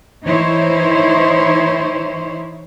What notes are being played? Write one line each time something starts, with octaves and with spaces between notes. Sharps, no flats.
E3 D#4 E4 C5 C#5